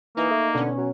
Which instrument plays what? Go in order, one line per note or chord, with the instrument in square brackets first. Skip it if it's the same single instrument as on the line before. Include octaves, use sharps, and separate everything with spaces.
[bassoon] E3 [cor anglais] A#3 [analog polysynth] D#4
[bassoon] A3
[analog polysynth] B2 C#4 [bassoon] D3
[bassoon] F#3